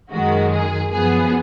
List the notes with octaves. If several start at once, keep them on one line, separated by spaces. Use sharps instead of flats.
F#2 D#3 G#3 F#4
G#4
F#2 F3 B3 G#4